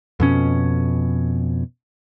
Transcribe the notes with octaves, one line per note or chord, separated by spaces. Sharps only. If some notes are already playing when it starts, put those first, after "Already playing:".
F2 B2 C#4